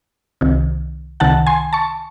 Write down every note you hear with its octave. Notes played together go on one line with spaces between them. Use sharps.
C2 C3 D#3
C2 C3 D#3 F#5 A5
G#5 C6
A5 C#6